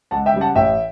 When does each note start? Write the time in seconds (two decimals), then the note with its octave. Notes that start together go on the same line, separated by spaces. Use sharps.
0.11 C#2 F#5 A5
0.26 E5 G5
0.34 C#3 G3
0.41 F#5 A5
0.55 A1 E5 G5